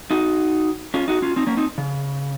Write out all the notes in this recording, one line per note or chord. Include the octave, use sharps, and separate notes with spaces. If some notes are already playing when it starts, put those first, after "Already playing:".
D#4 F#4
C#4 F4
D#4 F#4
C#4 F4
C4 D#4
A#3 C#4
C4 D#4
C#3